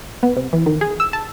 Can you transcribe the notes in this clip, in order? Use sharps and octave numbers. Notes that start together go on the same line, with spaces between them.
B3
C3
E3
D#3
G#4
E6
A5